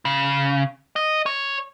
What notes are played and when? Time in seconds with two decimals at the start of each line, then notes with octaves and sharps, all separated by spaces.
0.05 C#3
0.96 D#5
1.26 C#5